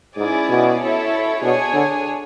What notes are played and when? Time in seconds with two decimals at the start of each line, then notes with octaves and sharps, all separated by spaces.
0.17 G#2 C#4 E4 G#4 D5
0.49 B2
0.80 E4 A4 C#5 E5
1.43 B2 D4 G#4 C#5 G#5
1.74 D3